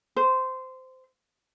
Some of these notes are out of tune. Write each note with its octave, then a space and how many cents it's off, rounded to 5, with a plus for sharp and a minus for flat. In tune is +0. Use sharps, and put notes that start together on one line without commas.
C5 -15